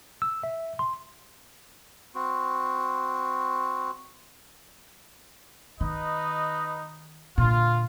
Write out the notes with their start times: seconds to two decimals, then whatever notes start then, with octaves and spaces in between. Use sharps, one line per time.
0.22 E6
0.43 E5
0.79 C6
2.15 C4 F#4
5.81 D#3 D#4 B4 D#5
7.38 A#2 D3 F4